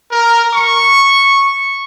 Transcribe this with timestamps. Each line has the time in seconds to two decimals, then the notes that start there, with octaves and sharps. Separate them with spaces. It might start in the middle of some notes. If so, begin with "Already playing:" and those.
0.12 A#4
0.53 C#6